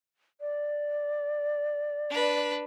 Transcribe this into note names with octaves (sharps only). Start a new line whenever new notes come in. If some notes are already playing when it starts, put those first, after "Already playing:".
D5
D4 B4